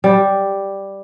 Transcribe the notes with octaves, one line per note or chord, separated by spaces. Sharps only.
G3